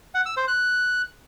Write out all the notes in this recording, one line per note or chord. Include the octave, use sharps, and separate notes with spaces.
F#5
E6
C5
F#6